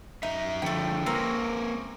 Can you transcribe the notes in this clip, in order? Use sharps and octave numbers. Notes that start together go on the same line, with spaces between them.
F#2 E3 D#4 E5
D3 F3 A3 G5
A#3 C4 C#4 A#4 B4 A#5